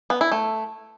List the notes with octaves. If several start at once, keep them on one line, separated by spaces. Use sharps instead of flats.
B3
E4
A3